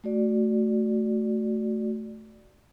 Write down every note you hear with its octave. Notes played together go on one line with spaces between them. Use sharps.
A3 F#4 D5